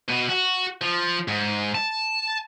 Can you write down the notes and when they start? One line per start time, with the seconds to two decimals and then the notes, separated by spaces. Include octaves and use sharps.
0.09 B2
0.29 F#4
0.81 F3
1.28 G#2
1.75 A5